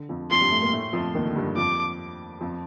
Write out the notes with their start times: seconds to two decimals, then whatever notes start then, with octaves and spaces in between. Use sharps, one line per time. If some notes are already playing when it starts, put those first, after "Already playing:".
Already playing: D3
0.09 F2 F3
0.31 F2 F3 C6
0.41 G2 G3
0.51 A2 A3
0.62 A#2 A#3
0.73 A2 A3
0.93 F2 F3
1.15 D#2 D#3
1.25 D3
1.36 G2 G3
1.57 F2 F3 D6
2.41 F2 F3